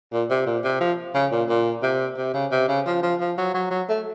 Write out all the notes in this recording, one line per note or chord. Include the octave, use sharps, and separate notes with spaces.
A#2
C3
A#2
C3
F3
C#3
A#2
A#2
C3
C3
C#3
C3
C#3
F3
F3
F3
F#3
F#3
F#3
A3